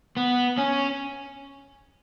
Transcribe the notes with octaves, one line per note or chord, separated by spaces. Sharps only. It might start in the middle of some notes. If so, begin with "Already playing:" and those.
B3
C#4